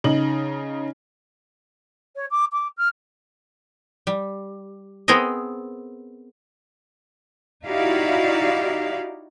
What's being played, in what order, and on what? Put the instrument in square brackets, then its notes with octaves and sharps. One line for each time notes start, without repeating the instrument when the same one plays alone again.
[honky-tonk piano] C#3 D#4 F#7
[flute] C#5
D6
D6
F6
[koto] G3
B3 C4 G#4 A#4 D#5
[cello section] D#4 E4 F#4 G4 D5 F5